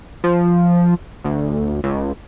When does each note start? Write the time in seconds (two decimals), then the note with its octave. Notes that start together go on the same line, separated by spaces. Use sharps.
0.24 F3
1.24 D2
1.84 C#2